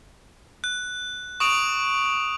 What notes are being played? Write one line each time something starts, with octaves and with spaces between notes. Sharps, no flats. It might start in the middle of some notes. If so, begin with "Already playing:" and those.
F#6
C#6 D#6 D7 F7